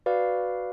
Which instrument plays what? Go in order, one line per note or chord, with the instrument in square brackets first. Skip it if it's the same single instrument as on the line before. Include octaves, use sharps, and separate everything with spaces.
[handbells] F#4 B4 D5 F5